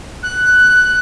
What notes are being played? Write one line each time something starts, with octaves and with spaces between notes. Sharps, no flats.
F#6